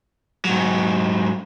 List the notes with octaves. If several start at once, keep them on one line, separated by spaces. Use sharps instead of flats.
G#2 F#3